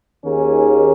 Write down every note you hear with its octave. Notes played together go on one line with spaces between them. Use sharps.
D#2 D#3 A#3 C#4 G#4